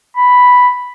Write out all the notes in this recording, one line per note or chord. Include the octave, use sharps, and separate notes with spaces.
B5